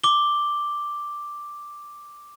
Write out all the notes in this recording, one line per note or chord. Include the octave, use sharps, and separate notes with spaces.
D6 G7